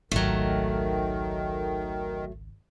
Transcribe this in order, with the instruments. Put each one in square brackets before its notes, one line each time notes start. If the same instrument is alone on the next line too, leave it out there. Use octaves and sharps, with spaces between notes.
[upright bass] G#1 C#2 [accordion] D#3 [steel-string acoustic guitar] F#3 A3